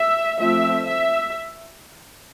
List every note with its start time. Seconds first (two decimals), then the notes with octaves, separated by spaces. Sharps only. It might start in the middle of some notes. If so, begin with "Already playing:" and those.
Already playing: E5
0.39 F3 A3 C4 E5
0.85 E5